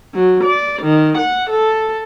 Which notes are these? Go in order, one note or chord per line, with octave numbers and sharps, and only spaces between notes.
F#3
D5
D#3
F#5
A4